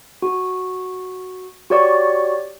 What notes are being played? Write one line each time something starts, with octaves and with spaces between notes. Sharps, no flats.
F#4
F#4 G4 C#5 D5 C#6